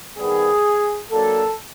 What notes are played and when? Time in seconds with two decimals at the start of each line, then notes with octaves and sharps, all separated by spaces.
0.17 D#3 G3 B3 G#4
1.10 F#3 A#3 D4 A4